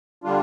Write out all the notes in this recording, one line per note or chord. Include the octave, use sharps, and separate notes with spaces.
D3 G3 D4 F4